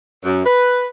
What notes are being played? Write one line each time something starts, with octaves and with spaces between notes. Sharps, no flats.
F#2
B4